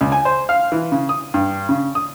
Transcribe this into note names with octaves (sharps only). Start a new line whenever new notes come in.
C#2
G#5
C5
F5
E3
C#3
D#6
G2
C#3
D#6